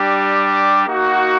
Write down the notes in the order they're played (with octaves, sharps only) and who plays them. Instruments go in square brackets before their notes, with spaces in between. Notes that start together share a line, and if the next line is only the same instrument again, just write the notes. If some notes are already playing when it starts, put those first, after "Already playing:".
Already playing: [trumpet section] G3 D4 G4
D6
A#3 D#4 F#4